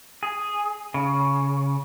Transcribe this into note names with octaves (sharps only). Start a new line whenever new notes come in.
G#4
C#3